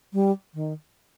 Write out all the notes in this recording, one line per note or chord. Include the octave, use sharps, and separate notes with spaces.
G3
D#3